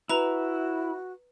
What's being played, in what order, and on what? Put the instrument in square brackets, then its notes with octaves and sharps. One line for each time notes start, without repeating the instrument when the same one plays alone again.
[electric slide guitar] E4 [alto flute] F#4 [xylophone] B4 A#5 F7